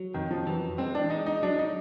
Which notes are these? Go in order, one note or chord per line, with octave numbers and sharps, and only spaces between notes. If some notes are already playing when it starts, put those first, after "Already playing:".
Already playing: F#3
F2 D#3
F3
E3 F#3
G#3 C4
D4
G#3 D#4
D#4
F#3 D4
D#4